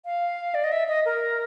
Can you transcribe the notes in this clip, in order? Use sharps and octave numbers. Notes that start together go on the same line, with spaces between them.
F5
D5
D#5
E5
D#5
A#4